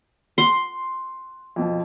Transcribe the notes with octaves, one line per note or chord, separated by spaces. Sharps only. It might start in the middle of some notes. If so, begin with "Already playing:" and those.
F#5 C6
F2 B2 F3